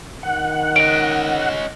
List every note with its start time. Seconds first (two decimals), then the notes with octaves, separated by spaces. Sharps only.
0.23 D#3 F#5
0.76 C#4 D#5 D7